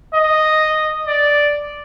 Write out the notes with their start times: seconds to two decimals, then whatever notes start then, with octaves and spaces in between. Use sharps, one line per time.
0.14 D#5
1.07 D5